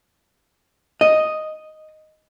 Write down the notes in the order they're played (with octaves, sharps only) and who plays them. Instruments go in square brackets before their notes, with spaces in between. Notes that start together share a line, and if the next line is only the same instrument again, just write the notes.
[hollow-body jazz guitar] D#5